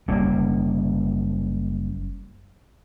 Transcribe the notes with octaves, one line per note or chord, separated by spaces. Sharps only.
F#1 G3 A#3 C#4